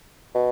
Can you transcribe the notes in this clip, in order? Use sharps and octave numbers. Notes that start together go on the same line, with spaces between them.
B2